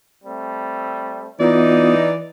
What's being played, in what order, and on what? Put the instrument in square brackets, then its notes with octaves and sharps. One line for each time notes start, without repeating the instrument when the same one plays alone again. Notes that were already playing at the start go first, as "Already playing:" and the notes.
[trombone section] G3 A3 C4
[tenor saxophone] E3 [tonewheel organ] B3 F4 [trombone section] D#4 [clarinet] D5